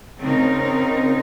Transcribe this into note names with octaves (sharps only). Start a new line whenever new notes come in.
C#3 C4 D#4 A#4